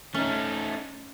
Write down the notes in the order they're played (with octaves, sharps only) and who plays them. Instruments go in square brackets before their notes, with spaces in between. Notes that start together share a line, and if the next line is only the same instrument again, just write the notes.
[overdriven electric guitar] A3 D#4 [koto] C#4